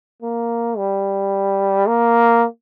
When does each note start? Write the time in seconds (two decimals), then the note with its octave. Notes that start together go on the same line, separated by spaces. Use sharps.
0.22 A#3
0.78 G3
1.87 A#3